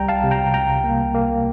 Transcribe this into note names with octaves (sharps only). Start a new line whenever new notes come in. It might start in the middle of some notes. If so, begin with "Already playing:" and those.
Already playing: C2 G3 G5 A#5
F5 A5
C3
G5 A#5
C2 G5 A#5
A#3
A#3